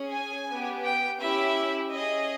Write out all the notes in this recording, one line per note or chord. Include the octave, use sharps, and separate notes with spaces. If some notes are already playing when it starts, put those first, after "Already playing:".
Already playing: C#4 G#4
G#5
B3 G4
G5
C#4 E4 G4 E5
C#4 G#4 D#5